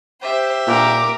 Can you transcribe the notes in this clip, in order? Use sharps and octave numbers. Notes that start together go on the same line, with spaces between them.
G4 C5 E5
A#2 A#4 D6